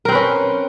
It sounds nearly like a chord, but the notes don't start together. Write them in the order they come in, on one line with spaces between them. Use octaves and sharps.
A#4 C4 B4 C#4